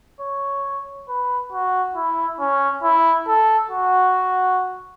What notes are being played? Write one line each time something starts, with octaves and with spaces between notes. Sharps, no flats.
C#5
B4
F#4
E4
C#4
E4
A4
F#4